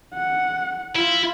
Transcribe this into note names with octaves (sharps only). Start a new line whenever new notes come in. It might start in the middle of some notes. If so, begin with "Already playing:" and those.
F#5
E4 F4